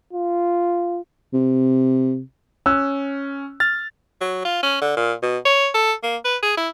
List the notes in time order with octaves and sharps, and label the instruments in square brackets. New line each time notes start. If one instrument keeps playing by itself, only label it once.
[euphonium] F4
[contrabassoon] C3
[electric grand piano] C#4 [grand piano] E6 F#6
[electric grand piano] F6 A6
[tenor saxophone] F#3
F4
C#4
D3
A#2
B2
C#5
A4
A#3
B4
G#4
E4